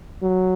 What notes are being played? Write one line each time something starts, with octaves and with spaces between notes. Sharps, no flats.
F#3